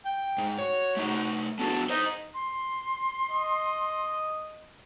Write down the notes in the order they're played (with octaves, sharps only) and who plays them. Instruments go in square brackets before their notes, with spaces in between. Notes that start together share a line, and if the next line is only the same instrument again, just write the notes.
[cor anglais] G5
[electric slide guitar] G#2
[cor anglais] F#4 [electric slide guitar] C#5
[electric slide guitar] A3 D#4
[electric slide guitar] B3 D4 F#4 [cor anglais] A4
[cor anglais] D#4 [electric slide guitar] C5 D#5
[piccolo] C6
[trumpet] D#5